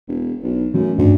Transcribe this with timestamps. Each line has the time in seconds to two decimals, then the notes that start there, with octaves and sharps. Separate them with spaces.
0.08 E1
0.43 B1
0.74 F#2 E3 A3 C#4
0.98 D2 G2